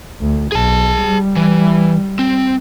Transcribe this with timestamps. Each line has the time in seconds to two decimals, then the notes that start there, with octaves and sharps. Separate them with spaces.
0.21 D2
0.52 B1 G#4 A5
1.02 G3
1.36 E3
2.19 C4